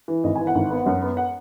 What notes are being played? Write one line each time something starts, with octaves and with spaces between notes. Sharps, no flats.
E3
G#1 D#5
E3 G#5
F#5
G#1
B3
F#2
B3
F#5